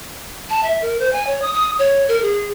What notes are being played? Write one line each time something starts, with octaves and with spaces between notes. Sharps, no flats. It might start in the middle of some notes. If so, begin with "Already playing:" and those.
A5
E5
A#4
C5
G#5
C#5
D#6
D#6
C#5
A#4
G#4